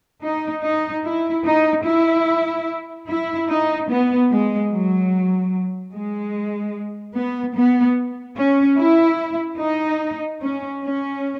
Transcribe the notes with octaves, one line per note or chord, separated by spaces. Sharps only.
D#4
D#4
E4
D#4
E4
E4
D#4
B3
G#3
F#3
G#3
B3
B3
C#4
E4
D#4
C#4
C#4